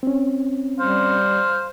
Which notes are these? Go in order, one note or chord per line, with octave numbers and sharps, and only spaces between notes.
C4 C#4
G3 C5 F5